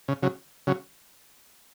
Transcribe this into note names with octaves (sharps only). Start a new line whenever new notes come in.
C#3
C#3 F#3
C#3 F#3